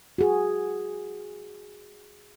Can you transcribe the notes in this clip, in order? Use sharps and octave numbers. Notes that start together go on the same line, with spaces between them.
F#4 G#4